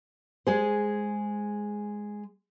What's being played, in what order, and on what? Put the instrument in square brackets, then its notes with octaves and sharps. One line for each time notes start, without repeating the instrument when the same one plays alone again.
[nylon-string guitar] G#3 G#4 C5